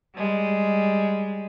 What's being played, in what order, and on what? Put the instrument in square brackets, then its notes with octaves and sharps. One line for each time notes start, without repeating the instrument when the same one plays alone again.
[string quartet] G3 G#3